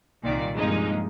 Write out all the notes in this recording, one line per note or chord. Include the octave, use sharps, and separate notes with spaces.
C2 A#2 D#3 D5
G2 C3 F3 G#3 A#3 D#4